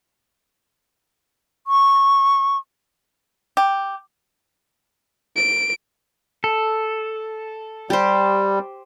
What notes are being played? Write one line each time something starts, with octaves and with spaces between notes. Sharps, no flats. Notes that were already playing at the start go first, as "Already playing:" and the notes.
C#6
G4
D7
A4
G3 G4 C5